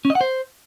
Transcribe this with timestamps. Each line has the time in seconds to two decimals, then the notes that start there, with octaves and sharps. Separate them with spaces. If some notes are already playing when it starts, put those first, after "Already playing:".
0.05 C#4
0.10 D#5
0.15 F#5
0.21 C5